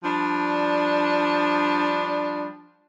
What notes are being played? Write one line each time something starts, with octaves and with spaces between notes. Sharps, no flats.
F3 G3 D4